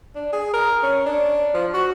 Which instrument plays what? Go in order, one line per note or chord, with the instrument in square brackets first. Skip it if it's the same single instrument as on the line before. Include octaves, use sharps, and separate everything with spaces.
[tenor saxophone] D4
G#4
A#4
C#4
D4
F3
F#4